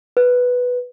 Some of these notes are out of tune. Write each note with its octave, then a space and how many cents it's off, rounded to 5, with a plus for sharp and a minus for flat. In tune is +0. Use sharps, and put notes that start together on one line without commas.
B4 +0